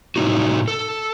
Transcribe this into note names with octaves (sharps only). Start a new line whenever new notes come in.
A2 C3 A3 A#3 D#4 F#4
A4